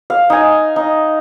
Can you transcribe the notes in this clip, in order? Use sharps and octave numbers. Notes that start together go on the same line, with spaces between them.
F5
D#4 G#5
D#4